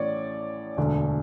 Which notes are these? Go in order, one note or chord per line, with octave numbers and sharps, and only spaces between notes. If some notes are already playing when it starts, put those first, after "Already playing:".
Already playing: A1 A2 E3 A3 C#4 C#5 D5
E1 D2 D3 A3